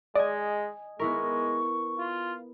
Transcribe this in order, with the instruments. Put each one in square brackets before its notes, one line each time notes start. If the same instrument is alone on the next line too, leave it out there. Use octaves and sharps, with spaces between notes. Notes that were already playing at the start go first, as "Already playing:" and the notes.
[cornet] G#3 [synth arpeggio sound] D5 [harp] D#5 G#5
[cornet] G#3 [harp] B3 E4 A#4 [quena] C#6
[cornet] F4